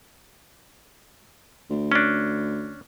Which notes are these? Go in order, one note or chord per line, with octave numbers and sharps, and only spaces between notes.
D2
C#4 D4